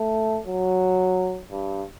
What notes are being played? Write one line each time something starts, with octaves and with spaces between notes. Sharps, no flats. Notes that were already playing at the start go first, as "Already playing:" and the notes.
Already playing: A3
F#3
G2